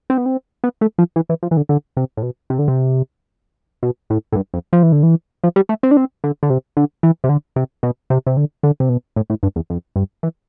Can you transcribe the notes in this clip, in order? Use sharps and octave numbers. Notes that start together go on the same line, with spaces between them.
C4
B3
C4
B3
A3
F3
E3
E3
F3
E3
D3
D3
C3
A2
B2
C3
D3
C3
B2
A2
A2
G2
F2
F3
E3
D3
E3
F3
G3
A3
C4
D4
C4
D3
D3
C3
D3
E3
C3
D3
C3
B2
C3
C3
D3
D3
C3
B2
A2
A2
G2
E2
F2
G2
E3